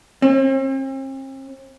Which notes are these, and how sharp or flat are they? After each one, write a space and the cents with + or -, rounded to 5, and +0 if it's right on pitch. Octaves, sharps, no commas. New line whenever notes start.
C4 +45